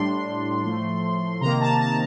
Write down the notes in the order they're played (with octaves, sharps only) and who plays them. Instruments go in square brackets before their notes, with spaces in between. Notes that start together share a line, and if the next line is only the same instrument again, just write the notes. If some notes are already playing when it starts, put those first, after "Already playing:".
Already playing: [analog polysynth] A2 G3 D4 C6
A2 F3 A3
C3 D#3 A#3 A#5
A5
A5